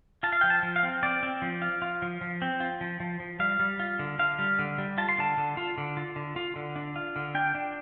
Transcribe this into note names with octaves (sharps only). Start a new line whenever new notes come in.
F4 A5
F5
F3 G5
A5
F3
F5
C4
C4 D5
C4
F3
F4
F4
F3
F3
C4
F4
F3
F3
F3
G3 F5
G3
F4
D3
D3 F5
G3
D3
G3
F4 A5
C6
D3 A5
D3
F4
D3
F4
D3
F4
D3
D4
F4
D3
D4 G5
D4